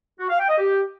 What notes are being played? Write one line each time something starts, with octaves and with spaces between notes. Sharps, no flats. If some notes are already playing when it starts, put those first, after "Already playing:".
F#4
F5
G5
D#5
G4